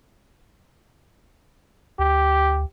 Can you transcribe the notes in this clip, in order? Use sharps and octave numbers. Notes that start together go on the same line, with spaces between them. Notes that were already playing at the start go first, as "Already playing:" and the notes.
D2 G4